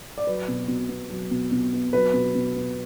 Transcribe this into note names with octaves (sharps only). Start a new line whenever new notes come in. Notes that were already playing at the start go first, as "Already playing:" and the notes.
D5
F#3 B4
B2
B2
B3
F#3
B2
B2
B3
F#3 B4
B2
B2
B3